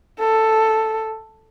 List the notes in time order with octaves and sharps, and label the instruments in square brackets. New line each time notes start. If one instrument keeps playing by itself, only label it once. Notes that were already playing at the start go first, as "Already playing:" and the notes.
[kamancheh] A4